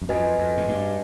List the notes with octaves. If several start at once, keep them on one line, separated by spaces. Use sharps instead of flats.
F#2
F2 F#4 B4 D#5 G#5
F2
G#2
G2